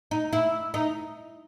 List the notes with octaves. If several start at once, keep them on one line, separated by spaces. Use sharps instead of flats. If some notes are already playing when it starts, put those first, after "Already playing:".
D#4
E4
D#4